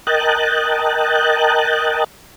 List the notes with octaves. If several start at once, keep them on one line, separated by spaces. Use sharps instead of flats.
A#4 D#5 G5 A5 F#6